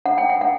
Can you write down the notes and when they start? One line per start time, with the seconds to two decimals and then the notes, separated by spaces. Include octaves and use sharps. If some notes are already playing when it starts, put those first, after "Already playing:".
0.06 F#5
0.18 G5
0.29 F#5
0.41 F#5